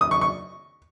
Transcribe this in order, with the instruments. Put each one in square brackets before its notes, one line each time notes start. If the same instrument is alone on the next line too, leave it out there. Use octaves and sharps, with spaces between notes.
[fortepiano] D#6
C#6
C#6